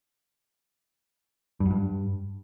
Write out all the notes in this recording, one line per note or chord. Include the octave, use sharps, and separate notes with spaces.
G2
F#2
G2